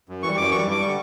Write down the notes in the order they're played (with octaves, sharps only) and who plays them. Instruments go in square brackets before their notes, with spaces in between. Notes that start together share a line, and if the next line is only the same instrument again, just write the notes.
[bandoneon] F#2
E3 G3 C#6
F#2 D6
E3 G3 C#6
G2 D6
G3 C#6
D3